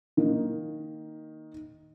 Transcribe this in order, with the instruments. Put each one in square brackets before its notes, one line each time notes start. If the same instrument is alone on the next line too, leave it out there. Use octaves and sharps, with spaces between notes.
[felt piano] D#3 A#3 D#4